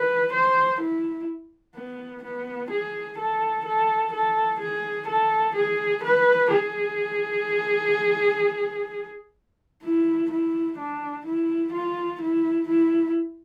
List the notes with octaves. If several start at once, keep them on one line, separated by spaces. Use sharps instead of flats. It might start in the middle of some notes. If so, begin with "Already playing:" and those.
Already playing: B4
C5
E4
B3
B3
G#4
A4
A4
A4
G#4
A4
G#4
B4
G#4
E4
E4
D4
E4
F4
E4
E4